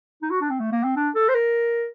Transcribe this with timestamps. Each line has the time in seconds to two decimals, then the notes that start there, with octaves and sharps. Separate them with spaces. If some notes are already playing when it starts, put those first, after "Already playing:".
0.22 D#4
0.31 F#4
0.41 D4
0.50 C4
0.60 A3
0.72 A#3
0.84 C4
0.97 D4
1.15 A4
1.29 C5
1.35 A#4